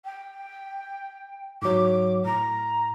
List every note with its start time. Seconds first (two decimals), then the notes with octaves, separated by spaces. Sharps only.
0.05 G5
1.62 G#2 F#3 D6
2.25 A2 A#5